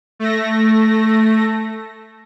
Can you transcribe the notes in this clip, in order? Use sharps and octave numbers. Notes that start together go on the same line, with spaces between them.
A3 A#6